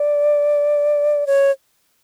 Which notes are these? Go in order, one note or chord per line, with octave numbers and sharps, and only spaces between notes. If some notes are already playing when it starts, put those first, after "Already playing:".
Already playing: D5
C#5